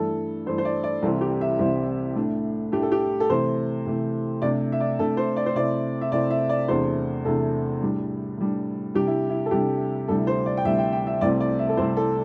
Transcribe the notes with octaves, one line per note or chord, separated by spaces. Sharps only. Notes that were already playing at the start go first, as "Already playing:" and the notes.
Already playing: G2 E3 A3 A4
G2 E3 A3 C5
C5
D5
D5
C2 C3 E3 C4 E4 A4
G4
E5
C2 C3 E3 C4 E4
A2 A3 D4
A2 A3 D4 G4
A4
G4
A4
C3 E3 A3 C5
C3 E3 A3
C3 A3 D4 D5
E5
D5
C3 A3 D4 A4
C5
D5
C5
C3 A3 C4 E4 D5
E5
C3 A3 C4 E4 D5
E5
D5
E2 C3 A3 D4 C5
E2 C3 A3 D4 A4
A2 G3 D4
A2 G3 D4
C3 G3 D4 G4
E4
E4
A4
C3 G3 D4 G4
D2 C3 G3 E4 A4
C5
D5
G5
D2 C3 G3 E4 E5
G5
G5
E5
C2 C3 A3 C4 E4 D5
D5
E5
A4
C2 C3 A3 C4 E4 C5
A4